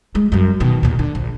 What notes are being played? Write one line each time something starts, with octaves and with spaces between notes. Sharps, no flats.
G#3
F#2 G3
B2 D#3
D#2 A#2
D3
A#1